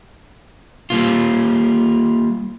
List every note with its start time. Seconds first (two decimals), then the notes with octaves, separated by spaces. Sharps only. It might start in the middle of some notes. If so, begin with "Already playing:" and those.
0.90 G3 A#3 F4